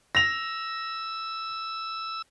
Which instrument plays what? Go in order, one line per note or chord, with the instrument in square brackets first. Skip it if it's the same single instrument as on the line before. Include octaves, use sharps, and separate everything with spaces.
[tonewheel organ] E6 [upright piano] A#6 F7